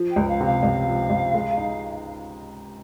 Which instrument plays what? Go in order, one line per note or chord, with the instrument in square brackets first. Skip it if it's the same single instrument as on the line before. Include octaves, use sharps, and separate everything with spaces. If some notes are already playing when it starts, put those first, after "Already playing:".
Already playing: [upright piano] F3
[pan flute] G5
[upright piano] C#2
[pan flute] F5
[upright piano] C3 [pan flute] F5
[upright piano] C#2
F3
C#2
G#3
D#4